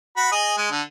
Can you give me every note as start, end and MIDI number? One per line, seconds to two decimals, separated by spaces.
0.17 0.31 66
0.17 0.31 83
0.32 0.53 68
0.32 0.53 75
0.57 0.67 56
0.71 0.82 50